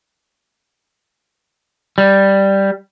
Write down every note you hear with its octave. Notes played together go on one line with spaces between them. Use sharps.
G3